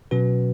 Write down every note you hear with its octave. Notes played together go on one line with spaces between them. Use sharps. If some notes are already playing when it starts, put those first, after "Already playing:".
B2 F#3 C#4 F#4 B4